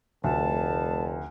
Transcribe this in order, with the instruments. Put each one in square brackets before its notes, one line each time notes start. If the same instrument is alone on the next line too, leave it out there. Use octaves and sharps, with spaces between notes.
[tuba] F1 [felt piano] D2 [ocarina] A5